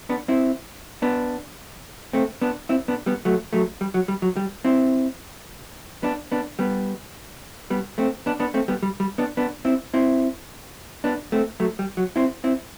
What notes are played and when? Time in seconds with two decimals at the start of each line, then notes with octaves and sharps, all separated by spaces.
0.10 B3 D4
0.28 C4 E4
1.02 B3 D4
2.13 A3 C4
2.42 B3 D4
2.69 C4 E4
2.88 B3 D4
3.06 G3 B3
3.25 F#3 A3
3.53 F#3 A3
3.81 G3
3.94 F#3
4.08 G3
4.22 F#3
4.36 G3
4.65 C4 E4
6.03 B3 D4
6.32 B3 D4
6.59 G3 B3
7.70 G3 B3
7.98 A3 C4
8.26 B3 D4
8.40 B3 D4
8.54 A3 C4
8.68 G3 B3
8.83 G3
9.00 G3
9.18 B3 D4
9.37 B3 D4
9.65 C4 E4
9.94 C4 E4
11.04 B3 D4
11.32 A3 C4
11.60 F#3 A3
11.79 G3
11.97 F#3
12.16 C4 E4
12.44 C4 E4